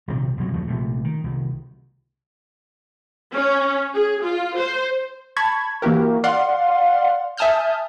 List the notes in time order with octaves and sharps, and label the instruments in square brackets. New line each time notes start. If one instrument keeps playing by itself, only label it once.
[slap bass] A#1 G#2 C3 D#3
C2 F2 B2 F#3
E2 F3 F#3 A3
A#1 C3 A3
D#3
C2 D#3
[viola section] C#4
G#4
F4
C5
[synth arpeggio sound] A5 B5 C#6 G#6
E3 A#3 E4 F#4 G4 A#4
D5 F5 F#5 C6
E5 G#5 A5 D#6 F6 G6